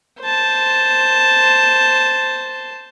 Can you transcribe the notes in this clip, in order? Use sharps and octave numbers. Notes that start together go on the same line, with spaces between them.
C5 A5